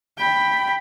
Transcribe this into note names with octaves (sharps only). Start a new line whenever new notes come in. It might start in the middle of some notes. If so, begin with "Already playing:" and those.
G5 B5